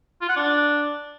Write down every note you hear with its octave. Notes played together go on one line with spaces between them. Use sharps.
F4
F#5
D4